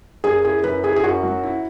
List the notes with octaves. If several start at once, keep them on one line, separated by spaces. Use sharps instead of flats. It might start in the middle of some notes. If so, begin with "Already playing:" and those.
F#2 G#4
E4 G#4
F#2 B4
E4 G#4
G#4
F#2 F#4
F#3
E4